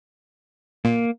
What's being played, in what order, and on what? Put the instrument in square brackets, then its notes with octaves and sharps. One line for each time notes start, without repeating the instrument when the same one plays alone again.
[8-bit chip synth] A#2 [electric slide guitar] A#3